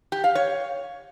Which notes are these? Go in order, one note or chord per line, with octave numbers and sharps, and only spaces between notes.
G4
F5
C#5